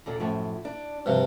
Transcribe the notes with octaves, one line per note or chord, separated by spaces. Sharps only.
D#2 A#2 D3
F#2 A2 F3
D4
G2 C3 F3 F#4